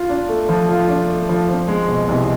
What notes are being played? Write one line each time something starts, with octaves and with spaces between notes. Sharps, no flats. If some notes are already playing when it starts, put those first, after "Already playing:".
Already playing: F4
D4
A3
F3
F4
D4
A3
F3
C4
G#3
B2
C2